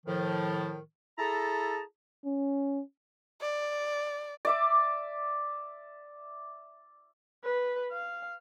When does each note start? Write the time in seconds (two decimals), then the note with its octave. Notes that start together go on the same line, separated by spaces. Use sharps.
0.05 A2 D#3 F3
1.17 E4 G#4 A4 A5 A#5
2.25 C#4
3.42 D5
4.45 D5 E5 D6
7.44 B4
7.92 F5